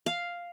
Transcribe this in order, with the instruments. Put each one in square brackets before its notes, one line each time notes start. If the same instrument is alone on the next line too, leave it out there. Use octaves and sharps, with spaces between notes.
[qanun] F5